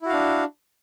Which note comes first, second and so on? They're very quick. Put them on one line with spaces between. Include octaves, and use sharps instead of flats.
E4 F#4 F5 D4